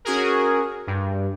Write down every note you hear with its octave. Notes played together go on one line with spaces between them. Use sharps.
C#4 F#4 G#4 A#4
G2